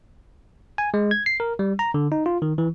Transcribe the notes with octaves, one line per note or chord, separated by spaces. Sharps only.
G#5
G#3
G#6
C7
A#4
G3
A#5
D3
D#4
F4
D#3
E3